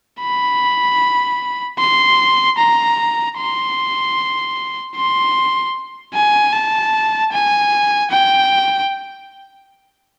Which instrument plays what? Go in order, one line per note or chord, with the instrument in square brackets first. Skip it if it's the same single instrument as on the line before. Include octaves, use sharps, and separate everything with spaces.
[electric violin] B5
C6
A#5
C6
C6
G#5
A5
G#5
G5